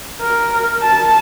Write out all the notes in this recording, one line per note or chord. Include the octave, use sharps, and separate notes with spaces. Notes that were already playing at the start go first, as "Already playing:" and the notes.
A#4
A5